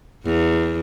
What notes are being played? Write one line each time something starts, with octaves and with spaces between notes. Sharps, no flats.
E2